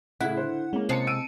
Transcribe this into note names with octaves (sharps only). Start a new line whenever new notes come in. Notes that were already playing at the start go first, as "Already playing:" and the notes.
A2 C#3 E4 F#5
D3 C5
G#3 A#3 C#4
C3 G#3 C4 F5 A5 C#7
E6 D7 D#7